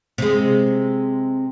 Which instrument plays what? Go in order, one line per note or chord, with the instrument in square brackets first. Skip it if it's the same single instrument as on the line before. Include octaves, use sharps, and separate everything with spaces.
[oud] C3 G#3